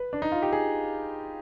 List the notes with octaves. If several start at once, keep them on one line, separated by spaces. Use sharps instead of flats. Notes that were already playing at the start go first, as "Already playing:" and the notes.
Already playing: B4
D4
D#4
F4
G4
G#4